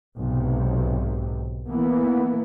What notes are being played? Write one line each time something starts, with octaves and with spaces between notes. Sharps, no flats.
B1 G#2 C3
E3 A#3 B3